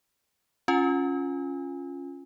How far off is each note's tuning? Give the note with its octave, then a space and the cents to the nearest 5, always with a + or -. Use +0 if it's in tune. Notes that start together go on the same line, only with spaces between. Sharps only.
C#4 +0 F4 +0 G#5 -20